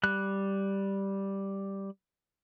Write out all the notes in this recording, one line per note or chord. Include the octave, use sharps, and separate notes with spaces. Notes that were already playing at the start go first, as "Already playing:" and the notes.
G3 F#6